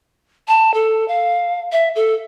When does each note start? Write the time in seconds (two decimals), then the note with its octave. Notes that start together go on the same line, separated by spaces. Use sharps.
0.48 A5
0.74 A4
1.08 F5
1.72 E5
1.96 A4